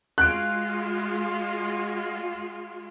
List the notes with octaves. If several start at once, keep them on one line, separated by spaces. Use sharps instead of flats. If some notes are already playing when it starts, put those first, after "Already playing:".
G#3 F4 F#4 F#6 D7